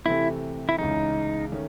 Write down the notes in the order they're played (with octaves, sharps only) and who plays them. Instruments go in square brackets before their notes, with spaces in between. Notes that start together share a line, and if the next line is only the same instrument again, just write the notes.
[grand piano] C3 E3 A3 C4 [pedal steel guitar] E4
[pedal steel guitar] E4
[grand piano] C#2 C#3 E3 [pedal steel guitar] D#4
[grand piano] D#3 A3 C#4